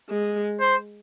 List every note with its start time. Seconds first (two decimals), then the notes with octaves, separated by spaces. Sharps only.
0.09 G#3
0.60 C5